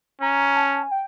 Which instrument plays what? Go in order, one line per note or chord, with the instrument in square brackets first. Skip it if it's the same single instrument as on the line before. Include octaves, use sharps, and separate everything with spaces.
[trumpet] C#4 [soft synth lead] A#5
[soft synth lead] A5
G#5
G5